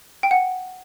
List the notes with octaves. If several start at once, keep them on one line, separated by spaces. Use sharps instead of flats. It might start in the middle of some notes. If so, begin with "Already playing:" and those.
G5
F#5